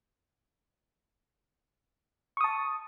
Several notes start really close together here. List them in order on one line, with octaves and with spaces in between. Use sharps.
C#6 D#6 A5